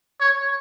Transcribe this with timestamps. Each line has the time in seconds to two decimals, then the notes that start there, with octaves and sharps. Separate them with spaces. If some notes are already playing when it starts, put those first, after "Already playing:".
0.20 C#5